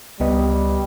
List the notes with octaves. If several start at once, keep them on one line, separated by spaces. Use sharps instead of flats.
C#2 G3 B3 D#5